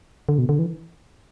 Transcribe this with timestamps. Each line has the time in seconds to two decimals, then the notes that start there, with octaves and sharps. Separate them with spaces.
0.29 D3
0.38 B2
0.49 D3
0.59 E3